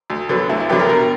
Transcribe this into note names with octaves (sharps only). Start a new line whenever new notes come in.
D2
D3 F#3 B3
D2 E4
E4
D3 F#3 B3 G4
A#4
B2 A#4